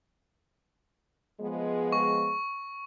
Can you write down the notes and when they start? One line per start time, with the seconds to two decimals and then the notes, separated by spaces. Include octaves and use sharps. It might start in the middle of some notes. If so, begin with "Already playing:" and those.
1.41 F3 G#3 B3
1.92 C#6